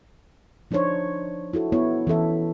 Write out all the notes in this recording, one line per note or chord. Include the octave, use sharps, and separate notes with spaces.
F3 D4 D#4 C5 C#5
E4 F#4 A4
B3 E4 C#5
E3 C#4 A4 E5